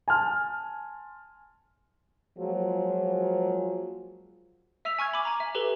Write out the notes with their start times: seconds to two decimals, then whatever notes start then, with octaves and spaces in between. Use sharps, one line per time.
0.08 G#5 A5 C6 F6
2.38 F3 F#3 G#3 A#3 F4 G#4
4.85 E5 E6 B6 F7
4.99 G#5 C#6 F6 G#6
5.14 B5 D6
5.25 G#5 A#5
5.40 E5
5.55 G4 A4 B4 F7 G7